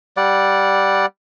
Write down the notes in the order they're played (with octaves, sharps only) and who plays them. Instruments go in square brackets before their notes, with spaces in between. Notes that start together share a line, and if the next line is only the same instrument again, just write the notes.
[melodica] G3 D5 F#5